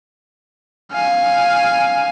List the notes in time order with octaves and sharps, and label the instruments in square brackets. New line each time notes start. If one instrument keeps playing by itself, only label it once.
[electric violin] F5 G#5